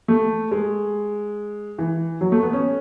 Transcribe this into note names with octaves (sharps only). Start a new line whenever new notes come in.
A3
G#3
E3
F#3
A3
B3
C#4